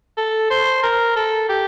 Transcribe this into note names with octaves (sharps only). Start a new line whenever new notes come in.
A4
C5
A#4
A4
G4